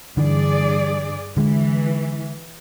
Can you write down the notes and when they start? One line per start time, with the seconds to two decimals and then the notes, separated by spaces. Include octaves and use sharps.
0.17 G2 D3 E3 G#4 D5
1.37 D3 E3 G#3